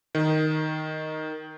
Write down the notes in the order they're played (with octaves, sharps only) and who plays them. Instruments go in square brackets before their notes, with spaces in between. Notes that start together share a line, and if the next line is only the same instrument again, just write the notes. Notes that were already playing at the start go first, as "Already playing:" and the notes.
[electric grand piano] D#3